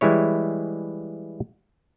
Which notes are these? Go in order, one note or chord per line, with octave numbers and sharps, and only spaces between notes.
E3 G3 G#3 E4 C#5